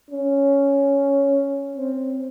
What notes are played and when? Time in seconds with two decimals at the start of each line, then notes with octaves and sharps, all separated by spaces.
0.11 C#4
1.77 C4